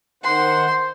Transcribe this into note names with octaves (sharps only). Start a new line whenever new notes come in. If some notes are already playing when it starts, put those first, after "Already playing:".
D#3 C5 F#5 C6